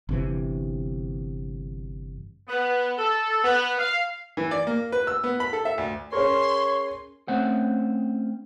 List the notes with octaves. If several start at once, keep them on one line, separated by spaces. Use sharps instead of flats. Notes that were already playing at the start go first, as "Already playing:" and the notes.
G1 C3 E3
B3
A4
B3
F5
E3
D5
A#3
B4
E6
B3
B5
A4
E5
D2
C#4 G#4 A#4 C#5 C6
A3 C4 C#4 C5 F#5